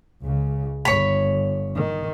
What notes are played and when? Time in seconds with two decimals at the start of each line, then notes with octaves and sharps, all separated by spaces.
0.22 C#2 C#3
0.85 G1 C#5 B5
1.75 D#3